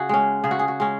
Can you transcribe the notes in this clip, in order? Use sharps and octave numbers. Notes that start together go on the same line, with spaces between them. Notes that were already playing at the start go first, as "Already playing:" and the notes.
Already playing: C#3 F#4 G#4
G#3 C#4
C#3 G#4
F#4
G#4
F#4
G#3 C#4